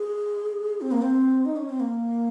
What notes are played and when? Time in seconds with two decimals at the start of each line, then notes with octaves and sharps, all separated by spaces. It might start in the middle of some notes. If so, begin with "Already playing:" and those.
Already playing: G#4
0.81 C4
0.92 A#3
1.02 C4
1.45 D#4
1.56 C#4
1.69 C4
1.80 A#3